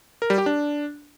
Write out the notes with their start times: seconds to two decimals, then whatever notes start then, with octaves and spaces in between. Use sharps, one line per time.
0.22 A#4
0.30 G3
0.38 G4
0.46 D4